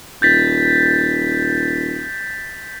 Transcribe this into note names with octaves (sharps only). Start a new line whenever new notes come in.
D#1 G6 A6 B6